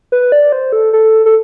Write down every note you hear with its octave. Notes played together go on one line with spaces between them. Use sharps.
B4
D5
C5
A4
A4
A4